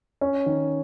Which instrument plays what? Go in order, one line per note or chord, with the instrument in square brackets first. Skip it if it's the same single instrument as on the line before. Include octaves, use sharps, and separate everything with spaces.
[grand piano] C#4
D#3